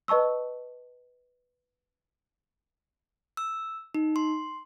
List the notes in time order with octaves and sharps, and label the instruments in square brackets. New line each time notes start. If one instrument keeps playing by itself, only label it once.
[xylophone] B4 D#5 A5 C#6 E6
[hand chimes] E6
D#4
C6